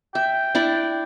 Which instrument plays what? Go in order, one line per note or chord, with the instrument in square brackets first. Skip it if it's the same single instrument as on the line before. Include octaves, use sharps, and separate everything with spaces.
[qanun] E5 [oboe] G5
[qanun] D4 E4 D5